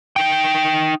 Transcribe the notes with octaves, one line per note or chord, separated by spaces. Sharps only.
D#4 G5